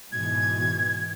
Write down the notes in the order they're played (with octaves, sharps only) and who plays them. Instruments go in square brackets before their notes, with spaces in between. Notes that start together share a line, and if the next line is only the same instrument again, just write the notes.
[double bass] G#2 [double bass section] B2 E3 [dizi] G#6